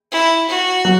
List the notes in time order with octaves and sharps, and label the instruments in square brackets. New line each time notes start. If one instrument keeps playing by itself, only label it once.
[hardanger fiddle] E4
F#4
[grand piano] F#3